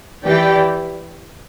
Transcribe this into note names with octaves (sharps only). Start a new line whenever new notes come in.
E3 G4 D5 G5